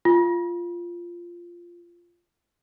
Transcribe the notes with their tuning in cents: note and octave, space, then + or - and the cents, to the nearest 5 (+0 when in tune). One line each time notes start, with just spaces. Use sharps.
F4 -10